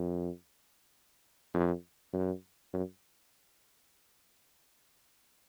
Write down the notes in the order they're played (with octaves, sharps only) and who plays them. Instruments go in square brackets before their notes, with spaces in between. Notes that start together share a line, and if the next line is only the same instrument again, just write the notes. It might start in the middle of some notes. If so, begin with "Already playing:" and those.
Already playing: [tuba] F2
F2
F#2
F#2